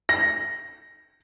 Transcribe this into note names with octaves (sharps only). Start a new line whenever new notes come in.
A#6